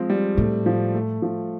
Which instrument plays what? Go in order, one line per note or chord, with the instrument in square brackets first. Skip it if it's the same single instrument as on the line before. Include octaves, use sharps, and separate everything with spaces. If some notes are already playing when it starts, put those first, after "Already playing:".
Already playing: [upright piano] F3 G#3 C4
G3
[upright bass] A2 [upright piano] A3
[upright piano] F3
A3
F3